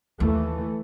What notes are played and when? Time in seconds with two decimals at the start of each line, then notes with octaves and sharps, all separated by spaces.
0.20 D#2 E3 A3